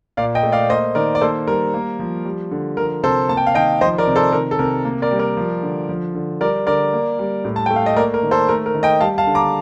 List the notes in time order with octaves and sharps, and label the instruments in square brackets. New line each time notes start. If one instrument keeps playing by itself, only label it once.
[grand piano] A#2 D5 F5
D#5 G5
A3
D5 F5
A#3 C5 D#5
D#3 A#4 D5
D5
A#3 A4 C5
G3 A#4
A#3
F3
G3
D3
F3 A#4
C3 A4 C5
A#3 A5
G5
F5
D#3 D#5 G5
F3 C5 D#5
A#4 D5
C3
A4 C5
D#3 A#4
A4
C3 A#4
A#3
A#4 D5
G3
A#4 D5
F3
D3
F3
D3
G3 A#4 D5
D3 A#4 D5
A#3
G3
A2
A5
A3 G5
F5
D#5
A#3 A#4 D5
A#4
D#3
A4 C5
A3 A#4
A#4
D#3
D#5 G5
G3 F5 A5
F5 A5
D3
A#5 D6